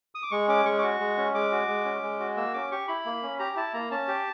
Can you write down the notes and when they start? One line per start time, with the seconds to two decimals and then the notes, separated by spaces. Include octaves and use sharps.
0.15 D#6
0.23 D6
0.31 G#3 C#6
0.48 C#4 D6
0.65 G#3 C#6
0.78 D6
0.82 F#4 C#6
1.00 G#3
1.18 C#4
1.34 G#3 D6
1.52 F#4
1.68 G#3
1.85 C#4
2.03 G#3
2.20 F#4
2.36 A#3 E6
2.54 C#4 D6
2.71 G4 C#6
2.88 E4 B5
3.06 A#3
3.23 C#4
3.39 G4 A#5
3.56 E4 A5
3.74 A#3 A#5
3.91 C#4 A5
4.08 G4